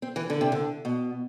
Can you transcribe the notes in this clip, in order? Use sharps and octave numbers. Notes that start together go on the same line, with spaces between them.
C4
E3
D3
C3
D3
B2